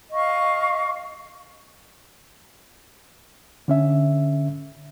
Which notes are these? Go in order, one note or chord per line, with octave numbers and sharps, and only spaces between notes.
D#5 F5 C#6
D3 C#4 E5